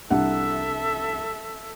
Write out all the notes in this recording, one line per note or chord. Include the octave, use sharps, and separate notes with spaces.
C2 D4 A4 E5 F#5